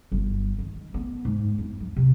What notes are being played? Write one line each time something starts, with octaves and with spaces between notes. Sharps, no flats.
G1
D#3
B3
G#2
E2
F3
C3